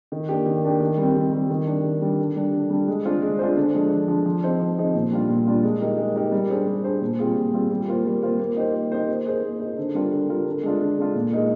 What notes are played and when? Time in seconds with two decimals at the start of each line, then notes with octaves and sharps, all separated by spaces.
0.12 D#3
0.29 A#3 D4 G4
0.46 D#3
0.64 A#3 D4 G4
0.81 D#3
0.98 G3 C4
1.15 D#3
1.32 G3 C4
1.50 D#3
1.66 G3 D4
1.84 D#3
2.02 G3 D4
2.18 D3
2.36 G3 D4
2.53 D3
2.70 G3 D4
2.88 G#3
3.05 D4 F4 G#4 C5
3.22 G#3
3.39 D4 F4 G#4 C5
3.57 D3
3.74 F3 G#3 D4
3.92 D3
4.08 F3 G#3 D4
4.26 F3
4.43 C4 D#4 G#4 C5
4.60 F3
4.78 C4 D#4 G#4 C5
4.94 A#2
5.12 G3 D4 F4
5.29 A#2
5.47 G3 D4 F4
5.63 G#3
5.81 D#4 G4 A#4
5.98 G#3
6.16 D#4 G4 A#4
6.32 G3
6.50 D4 G#4 C5
6.67 G3
6.84 D4 G#4 C5
7.01 A#2
7.19 G3 C4 F4 G#4
7.36 A#2
7.53 G3 C4 F4 G#4
7.71 G3
7.88 A#3 F4 C5
8.05 G3
8.22 A#3 F4 C5
8.40 A#3
8.57 D#4 G4 C5
8.74 A#3
8.92 D#4 G4 C5
9.08 A#3
9.25 D#4 G#4 C5
9.43 A#3
9.60 D#4 G#4 C5
9.78 D3
9.95 G3 D4 F4 A#4
10.12 D3
10.29 G3 D4 F4 A#4
10.46 D3
10.63 G#3 D4 F4
10.81 D3
10.98 G#3 D4 F4
11.15 A#2
11.32 G#3 D#4 A#4